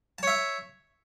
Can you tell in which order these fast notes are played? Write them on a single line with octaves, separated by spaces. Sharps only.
A5 C#5 E5